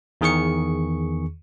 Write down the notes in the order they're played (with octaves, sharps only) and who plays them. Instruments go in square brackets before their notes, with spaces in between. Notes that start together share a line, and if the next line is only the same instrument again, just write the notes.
[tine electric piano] E2 D#3 G#4 C#6 C#7